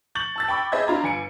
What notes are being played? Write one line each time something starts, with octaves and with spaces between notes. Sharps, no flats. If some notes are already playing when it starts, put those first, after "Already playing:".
C#6 G6 A6 F#7
A5 E6 A6
G5 B5 C#6 D6 E6
G#4 C5 D#5 E5 B5 G#6
D4 F4 A#5 B5
G1 G#5 C#7 D7